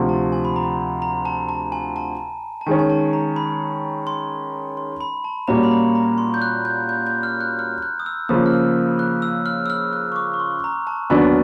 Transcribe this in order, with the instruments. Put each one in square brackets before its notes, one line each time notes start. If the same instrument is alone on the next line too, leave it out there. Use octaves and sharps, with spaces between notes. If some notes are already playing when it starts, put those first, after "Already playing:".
Already playing: [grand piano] D2 C3 F3
[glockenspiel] A5
G#5
B5
A#5
A#5
A5
A5
G#5
A5
A5
[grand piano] D#3 G#3 C#4 [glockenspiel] G#5
[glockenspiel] G#5
A5
A#5
B5
C6
C6
B5
A5
[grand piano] A#2 G3 A#3 C#4 F#4 [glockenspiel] A#5
[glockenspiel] B5
A#5
A#5
C6
G6
F#6
G6
G6
G6
F6
F#6
F6
F#6
D#6
E6
[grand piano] C#3 F3 A#3 [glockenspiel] D#6
[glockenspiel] F6
E6
F#6
E6
F6
E6
F6
F#6
C#6
D6
C#6
C6
A#5
A5
[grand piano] D#2 D3 F#3 B3 D4 [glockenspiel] G#5